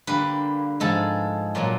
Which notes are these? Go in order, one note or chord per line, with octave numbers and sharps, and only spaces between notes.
D3 G3 A#3 B4
G#2 F3 G#3 A4
A#2 F#3 A#3